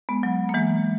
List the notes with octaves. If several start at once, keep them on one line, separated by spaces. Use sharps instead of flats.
G#3 B3
F#3
A#3
E3 G#3